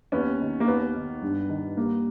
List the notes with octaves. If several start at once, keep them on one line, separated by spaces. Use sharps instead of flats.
D#2 B3 C#4
D#3
A#3
D#2 B3
D#3
G2
D#3
G3 A#3